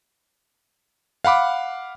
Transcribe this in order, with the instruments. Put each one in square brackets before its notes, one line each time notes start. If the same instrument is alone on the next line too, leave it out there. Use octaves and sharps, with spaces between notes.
[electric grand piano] F5 F#5 B5 D6